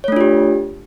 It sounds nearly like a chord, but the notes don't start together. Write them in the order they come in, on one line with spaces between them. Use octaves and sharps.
C#5 A3 D4 F4 G4